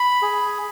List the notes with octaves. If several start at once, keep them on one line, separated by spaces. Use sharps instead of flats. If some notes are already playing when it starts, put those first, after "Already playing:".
Already playing: B5
G#4